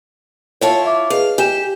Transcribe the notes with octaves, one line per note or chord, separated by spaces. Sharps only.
E4 F4 C#5 G5 A5
E5 D6
G#4 B4 D#5 F5
G4 G#5 E7